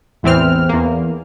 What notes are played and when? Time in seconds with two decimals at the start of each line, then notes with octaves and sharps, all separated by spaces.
0.23 A1 E2 E3 C4 F6
0.69 E2 A#3